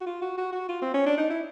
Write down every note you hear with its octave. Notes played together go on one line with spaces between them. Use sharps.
F#4
F4
F#4
F#4
F#4
F4
C4
C#4
D4
D#4
E4